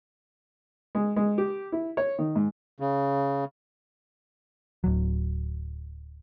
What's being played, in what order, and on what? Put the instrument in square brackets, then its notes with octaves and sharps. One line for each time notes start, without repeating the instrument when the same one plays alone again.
[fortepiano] G#3
G#3
G4
E4
C#5
D#3
G#2
[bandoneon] C#3
[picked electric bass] D1 F#3